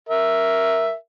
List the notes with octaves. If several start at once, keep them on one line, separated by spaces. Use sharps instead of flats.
A#4 E5